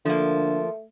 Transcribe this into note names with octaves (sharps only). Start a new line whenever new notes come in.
D3 F3 A3 A#3